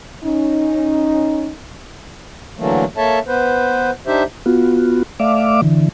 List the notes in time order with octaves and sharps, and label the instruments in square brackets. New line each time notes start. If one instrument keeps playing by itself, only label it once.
[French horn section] C#4 D#4
[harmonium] D3 E3 F#3 A3 A#3
A#3 A4 C#5 E5 A5
B3 B4 C5
D4 D#4 G4 C5 E5
[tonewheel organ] B3 F4 F#4
A3 D5 E5 F5 D6
D3 E3